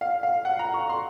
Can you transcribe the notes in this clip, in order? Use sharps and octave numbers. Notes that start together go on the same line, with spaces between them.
F5
F5
F#5
A#5
C#6
C6